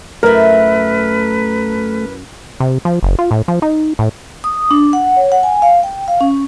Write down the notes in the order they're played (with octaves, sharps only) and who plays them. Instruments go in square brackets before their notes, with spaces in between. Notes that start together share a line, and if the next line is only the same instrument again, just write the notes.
[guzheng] F#2 E4 [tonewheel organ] A3 [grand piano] A#4 [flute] B4
[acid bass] C3
F3
F#1
F4
A2
F3
D#4
A2
[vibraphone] D#6
D4
F#5
C#5
F#5
G#5
F5
G5
F5
C#4